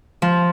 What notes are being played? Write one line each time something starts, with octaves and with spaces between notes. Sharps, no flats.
F3